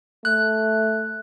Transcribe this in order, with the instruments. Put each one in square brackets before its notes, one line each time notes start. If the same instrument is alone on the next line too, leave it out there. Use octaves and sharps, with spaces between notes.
[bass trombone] A3 [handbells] F#6